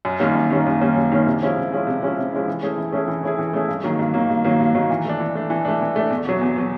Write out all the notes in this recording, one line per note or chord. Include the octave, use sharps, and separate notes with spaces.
F#2
D#3 G3 A#3 C#4
F#2
D#3 G3 A#3 C#4
F#2
D#3 G3 A#3 C#4
F#2
D#3 G3 A#3 C#4
C3
F3 G#3 C#4 E4
C3
F3 G#3 C#4 E4
C3
F3 G#3 C#4 E4
C3
F3 G#3 C#4 E4
E3
A3 C#4 E4 G#4
E3
A3 C#4 E4 G#4
E3
A3 C#4 E4 G#4
E3
A3 C#4 E4 G#4
G2
D#3 F#3 A#3
G2
D#3 F#3 A#3
G2
D#3 F#3 A#3
G2
D#3 F#3 A#3
E3
A3 D4
E3
A3 D4
E3
A3 D4
E3
A3 D4
E2
B2 F#3
E2
B2 F#3